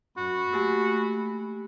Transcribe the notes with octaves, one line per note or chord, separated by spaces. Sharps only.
F#2 F#4 B5
A3 A#3 G4 G#5